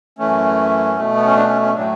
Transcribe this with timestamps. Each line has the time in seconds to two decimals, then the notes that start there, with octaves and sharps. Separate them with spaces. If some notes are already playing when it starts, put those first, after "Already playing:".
0.18 F#2 E3 A3 C#4
0.97 B2 A3
1.16 B3
1.25 C#4
1.35 D4
1.49 C#4
1.62 C#4
1.74 A2 F#3 A3 D4